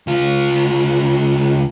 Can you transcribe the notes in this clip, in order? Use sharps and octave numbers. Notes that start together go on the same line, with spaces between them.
C#2 F4